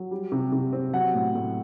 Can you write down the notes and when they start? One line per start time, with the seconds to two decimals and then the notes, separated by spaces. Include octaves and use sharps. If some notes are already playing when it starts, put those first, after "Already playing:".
Already playing: F#3
0.11 G3
0.32 C3
0.52 C3
0.73 C4
0.93 F#3 F#5
1.14 A2
1.35 A2